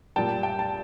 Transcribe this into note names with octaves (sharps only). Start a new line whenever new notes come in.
A#2 G3 G5 A5
G5 A5
A5